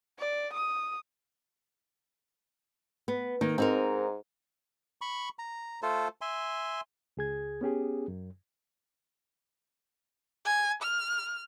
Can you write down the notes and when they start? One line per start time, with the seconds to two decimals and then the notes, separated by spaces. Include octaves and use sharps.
0.19 D5
0.54 D#6
3.08 B3
3.41 D#3 A#3
3.58 G#2 C4 D#4 A#4
5.01 B5 C#6
5.39 A#5
5.82 A3 F4 A4 C5
6.21 E5 G#5 C6
7.17 C#2 G#4 G#6
7.61 B3 C#4 G4 G#4
8.08 F#2
10.45 G#5
10.82 F6